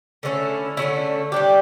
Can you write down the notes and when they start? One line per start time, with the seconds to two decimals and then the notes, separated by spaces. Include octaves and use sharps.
0.23 D3 A3 C#4 E4
0.77 D3 A3 C#4 E4
1.32 G3 D4 G4